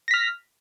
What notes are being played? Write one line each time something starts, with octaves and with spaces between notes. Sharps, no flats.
F6 A#6 B6